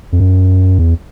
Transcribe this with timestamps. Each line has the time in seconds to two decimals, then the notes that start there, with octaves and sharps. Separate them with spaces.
0.12 F2
0.20 F#2
0.79 E2